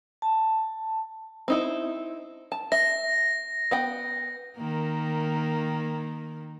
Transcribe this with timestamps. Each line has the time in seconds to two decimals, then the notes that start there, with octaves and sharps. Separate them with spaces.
0.22 A5
1.48 C4 D#4 E4
2.52 A5
2.72 E5 A#6
3.71 B3 F#5 G5
4.57 D#3 A#3